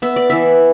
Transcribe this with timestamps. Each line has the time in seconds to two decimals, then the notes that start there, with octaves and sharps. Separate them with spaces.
0.02 B3 E5
0.16 D5
0.30 E3 E5